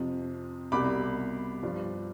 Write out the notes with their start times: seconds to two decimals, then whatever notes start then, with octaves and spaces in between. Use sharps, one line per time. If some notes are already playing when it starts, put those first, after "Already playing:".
Already playing: F2 C3 F3
0.72 C2 B2 G3 B5 D6
1.63 G2 F3